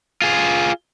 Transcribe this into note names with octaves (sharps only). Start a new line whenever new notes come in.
F4 G#4